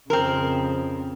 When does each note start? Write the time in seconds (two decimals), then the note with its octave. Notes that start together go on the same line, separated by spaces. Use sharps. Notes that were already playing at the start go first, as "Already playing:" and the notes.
0.10 F2 C#3 C4 A#4